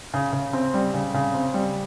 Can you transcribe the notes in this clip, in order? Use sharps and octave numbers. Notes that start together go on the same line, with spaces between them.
C#3
C#3
C4
G3
C#3
C#3
C4
G3